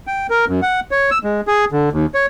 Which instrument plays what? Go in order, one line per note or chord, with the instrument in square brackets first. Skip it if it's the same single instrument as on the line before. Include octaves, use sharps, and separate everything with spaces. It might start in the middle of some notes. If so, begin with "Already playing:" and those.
[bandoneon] G5
A#4
F#2
F#5
C#5
E6
G#3
G#4
D3
D#2
C#5